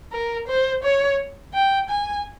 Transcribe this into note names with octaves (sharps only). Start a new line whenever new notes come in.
A#4
C5
C#5
G5
G#5